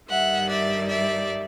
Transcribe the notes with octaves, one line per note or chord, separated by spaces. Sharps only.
G2 D#3 G3 E5 F#5
D5 E5
D5 E5